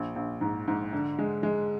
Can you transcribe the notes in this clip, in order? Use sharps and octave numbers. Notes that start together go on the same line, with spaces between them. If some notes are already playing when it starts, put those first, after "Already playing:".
Already playing: A#1
A#1
G#2
G#2
D3
G#3
G#3